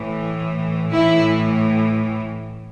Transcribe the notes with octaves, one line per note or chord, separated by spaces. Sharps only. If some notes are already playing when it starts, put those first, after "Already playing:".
Already playing: A2 E3
A2 E3 E4